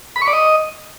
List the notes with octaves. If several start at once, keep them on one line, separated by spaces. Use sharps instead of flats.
B5
C#6
D5
D#5